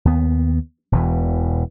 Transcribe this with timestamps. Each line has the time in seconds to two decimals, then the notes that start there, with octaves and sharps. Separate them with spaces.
0.05 D#2 B3
0.92 E1 E2 B2 E3